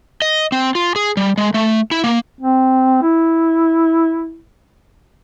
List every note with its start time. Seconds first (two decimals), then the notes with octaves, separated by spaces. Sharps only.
0.22 D#5
0.52 C4
0.75 F4
0.96 G#4
1.17 G3
1.38 G#3
1.54 A3
1.91 E4
2.04 A#3
2.41 C4
3.02 E4